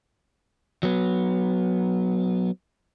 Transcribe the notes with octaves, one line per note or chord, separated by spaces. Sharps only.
F#3 B3